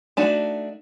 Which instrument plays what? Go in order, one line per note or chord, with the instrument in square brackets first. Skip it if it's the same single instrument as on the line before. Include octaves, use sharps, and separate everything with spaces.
[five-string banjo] A3 D4 D#4 F#4